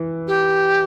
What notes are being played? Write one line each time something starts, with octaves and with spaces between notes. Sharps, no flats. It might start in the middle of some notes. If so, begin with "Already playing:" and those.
Already playing: E3
G4